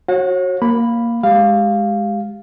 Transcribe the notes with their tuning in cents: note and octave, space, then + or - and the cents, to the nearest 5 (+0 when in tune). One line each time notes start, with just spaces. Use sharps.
F#4 +0 C#5 -35 F#5 -45
A#3 +0 B5 +0
G#3 +0 G4 +0 F5 +0